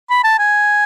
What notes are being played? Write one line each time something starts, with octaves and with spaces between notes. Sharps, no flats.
B5
A5
G#5